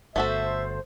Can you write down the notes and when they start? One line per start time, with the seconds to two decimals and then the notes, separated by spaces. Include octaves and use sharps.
0.16 G1 A3 F#4 A4 C5 E5